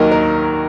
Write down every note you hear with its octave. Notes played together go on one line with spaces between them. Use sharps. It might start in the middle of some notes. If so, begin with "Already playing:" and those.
Already playing: D#2 D#3 F#3 A#4
A#4